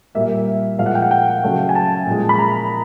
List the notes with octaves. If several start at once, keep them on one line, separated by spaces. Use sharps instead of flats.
A#2 G3 A#3 E5
A#2 F3 G#3 F5
F#5
G5
F#5
G5
C#3 F#3 A3
G#5
A5
A#2 F3 G#3
B5
A#5